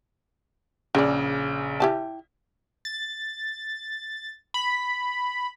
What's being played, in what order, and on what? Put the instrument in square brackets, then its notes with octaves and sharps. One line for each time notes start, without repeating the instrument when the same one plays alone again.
[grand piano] A#1 C#3 [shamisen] G#4 D5
[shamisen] E4 G4 A5
[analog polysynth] A6
B5